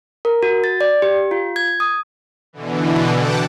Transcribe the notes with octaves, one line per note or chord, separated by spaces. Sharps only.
A#4
F#4
A6
D5
G4
F4
G#6
D#6
B2 D3 E3
F#5 G5 A5 D6